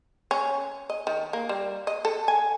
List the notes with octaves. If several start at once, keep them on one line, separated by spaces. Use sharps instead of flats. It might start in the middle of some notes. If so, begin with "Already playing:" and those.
C#4
D#5
D#3
A#3
G3
D#5
A4
G#5